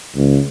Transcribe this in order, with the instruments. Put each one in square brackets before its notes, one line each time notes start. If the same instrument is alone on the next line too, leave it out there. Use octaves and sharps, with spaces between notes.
[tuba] C#2